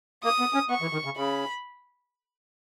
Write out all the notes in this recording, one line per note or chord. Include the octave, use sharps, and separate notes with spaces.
A#3 D#6
B3
C#4
B3 C#6
E3
D#3
C#3
C#3 B5